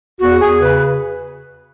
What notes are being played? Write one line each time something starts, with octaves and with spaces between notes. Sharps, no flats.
E2 F#4
E2 G#4
C#3 B4